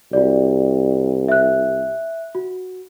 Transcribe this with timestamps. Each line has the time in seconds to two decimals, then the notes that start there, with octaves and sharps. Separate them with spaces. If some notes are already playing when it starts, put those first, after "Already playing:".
0.13 C2 F#4 D5
1.28 E5 F#6
2.35 F#4